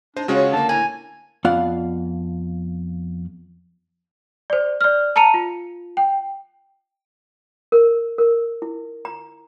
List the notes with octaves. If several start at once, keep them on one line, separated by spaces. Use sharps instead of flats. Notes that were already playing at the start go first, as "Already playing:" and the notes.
D4 D#4 C5
C#3 G#3 C#4 F4 F#4 C#5 F#5
D3 A#3 A5
A2 G#5 A#5
F2 B3 F4 D5 F5 F#5
C5 D5
D5 F6
A5 A#5 C#7 D#7 F7
F4
G5
A#4
A#4
E4
A#5